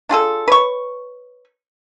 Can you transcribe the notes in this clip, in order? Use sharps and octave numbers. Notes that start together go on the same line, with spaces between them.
D4 F4 G#4 A4
B4 C#5 C#6